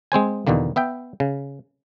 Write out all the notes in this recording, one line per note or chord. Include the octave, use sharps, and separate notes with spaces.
G#3 C4 C5 G#5
E2 B2 D3 D#3 A#3
B3 E5 G5
C#3